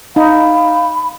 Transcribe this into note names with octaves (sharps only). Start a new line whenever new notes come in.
D#4 F5 B5